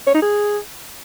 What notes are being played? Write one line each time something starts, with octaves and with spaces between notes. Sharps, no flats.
C#5
D#4
G#4